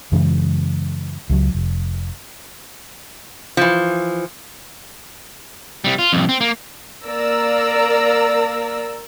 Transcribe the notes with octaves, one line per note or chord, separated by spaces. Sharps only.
F#2 C#3 E3 G#3
C#2 F#3
F1
E3 F3
C3 G3
F4
C2 F2
C4
A#3
A#3 A#4 D5 A#5 E6